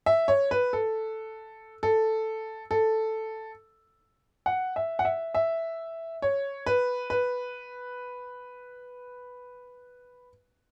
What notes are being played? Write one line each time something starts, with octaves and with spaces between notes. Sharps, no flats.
E5
C#5
B4
A4
A4
A4
F#5
E5
F#5
E5
E5
C#5
B4
B4